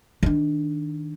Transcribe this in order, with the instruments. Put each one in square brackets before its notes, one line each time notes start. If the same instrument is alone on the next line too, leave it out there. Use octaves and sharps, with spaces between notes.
[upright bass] D#3 D4